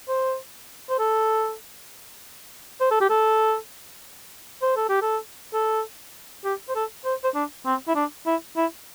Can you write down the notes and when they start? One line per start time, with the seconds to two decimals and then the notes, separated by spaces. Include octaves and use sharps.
0.08 C5
0.90 C5
0.99 A4
2.81 C5
2.91 A4
3.01 G4
3.09 A4
4.62 C5
4.76 A4
4.89 G4
5.02 A4
5.54 A4
6.44 G4
6.69 C5
6.75 A4
7.05 C5
7.24 C5
7.35 D4
7.66 C4
7.88 E4
7.95 D4
8.26 E4
8.56 E4